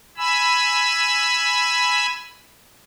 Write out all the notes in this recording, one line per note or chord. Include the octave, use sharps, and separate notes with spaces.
G#5 B5 E6